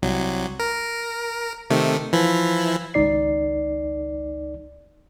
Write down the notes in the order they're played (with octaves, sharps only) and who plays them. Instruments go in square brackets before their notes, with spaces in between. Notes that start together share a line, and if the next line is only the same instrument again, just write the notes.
[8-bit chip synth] C2 F#3
A#4
C3 D#3 A3
E3 F3 E4
[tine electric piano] G#1 C#2 D#4 D5 C7